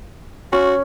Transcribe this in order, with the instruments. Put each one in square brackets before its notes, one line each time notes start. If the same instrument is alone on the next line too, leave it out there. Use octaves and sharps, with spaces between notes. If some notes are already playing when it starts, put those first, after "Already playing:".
[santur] C#4 [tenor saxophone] F#4